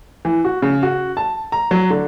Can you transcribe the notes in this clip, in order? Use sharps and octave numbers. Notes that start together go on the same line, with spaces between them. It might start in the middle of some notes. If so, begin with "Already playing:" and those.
E3
F#4
C#3
F#4
A5
A#5
F#3
D3